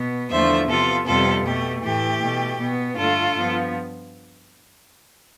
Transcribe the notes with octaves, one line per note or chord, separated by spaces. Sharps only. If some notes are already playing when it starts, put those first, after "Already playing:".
Already playing: B2 B3
E2 D3 F3 A3 C5 E5
C3 F3 B3 F4 A4
F2 C3 G3 B3 F4 A4
B2 A3 G4
A2 E3 A3 G4
B2 A3
B2 B3
G2 D3 A3 F4 A4
G2 F3 B3